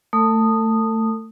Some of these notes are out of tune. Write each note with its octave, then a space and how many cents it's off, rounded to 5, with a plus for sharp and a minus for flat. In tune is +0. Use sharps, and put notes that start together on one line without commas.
A3 +15 A4 +45 D#6 -10